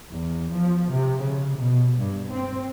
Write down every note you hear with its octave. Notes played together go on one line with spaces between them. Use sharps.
E2
F3
C3
C#3
B2
G2
C4